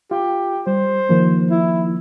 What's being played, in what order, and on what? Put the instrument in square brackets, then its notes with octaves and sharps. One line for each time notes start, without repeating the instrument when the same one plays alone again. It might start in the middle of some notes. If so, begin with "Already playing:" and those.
[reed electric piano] F4 [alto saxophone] G4
[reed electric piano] G3 [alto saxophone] C5
[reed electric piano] D#3 F3 A#3
[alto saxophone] E4